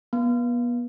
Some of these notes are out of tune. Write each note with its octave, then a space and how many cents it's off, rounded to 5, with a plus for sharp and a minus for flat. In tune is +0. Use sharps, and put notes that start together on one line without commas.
B3 -35